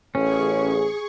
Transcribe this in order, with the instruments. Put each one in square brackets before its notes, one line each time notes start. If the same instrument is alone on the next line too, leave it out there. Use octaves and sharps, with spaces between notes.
[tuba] A1 [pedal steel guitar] C#4 [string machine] G#4 C#6